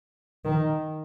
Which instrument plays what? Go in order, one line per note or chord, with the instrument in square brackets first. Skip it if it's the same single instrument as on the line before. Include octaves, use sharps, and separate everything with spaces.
[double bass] D#3